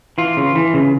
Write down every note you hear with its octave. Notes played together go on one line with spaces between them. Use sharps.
E3 F4
C#3
E3
C#3